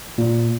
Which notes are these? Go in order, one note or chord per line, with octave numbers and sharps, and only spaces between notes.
A#2